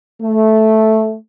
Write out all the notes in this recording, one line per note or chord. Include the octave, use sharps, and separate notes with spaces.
A3